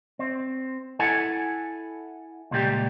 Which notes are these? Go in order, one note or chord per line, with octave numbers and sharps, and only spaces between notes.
C4
E4 A4 F#5 G#5
C#2 A#2 G3 G4